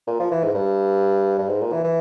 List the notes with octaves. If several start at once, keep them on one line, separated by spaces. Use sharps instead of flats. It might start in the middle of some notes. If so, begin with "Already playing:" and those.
A#2
F3
E3
G#2
G2
G2
G#2
A#2
E3
E3